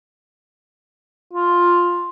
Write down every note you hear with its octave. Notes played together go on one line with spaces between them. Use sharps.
F4